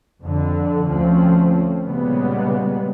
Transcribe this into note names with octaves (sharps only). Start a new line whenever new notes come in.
F2 D3
D2 F3 A3 C4 C#4
A#2 C#3 G3 G#3 B3